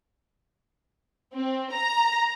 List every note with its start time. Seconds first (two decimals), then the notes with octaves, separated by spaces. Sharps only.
1.34 C4
1.71 A#5